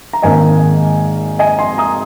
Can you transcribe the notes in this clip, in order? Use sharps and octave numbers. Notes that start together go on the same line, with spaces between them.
A#5
G#1 G#2 D#3 A#3 D#4 D#5 G#5
D#5 G#5
G#5 C6
A#5 D#6